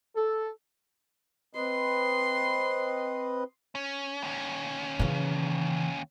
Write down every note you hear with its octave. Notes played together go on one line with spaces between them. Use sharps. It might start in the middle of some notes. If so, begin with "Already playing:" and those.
A4
C4 B4 D#5 C6
C#4
D#2 C#4
C#3 E3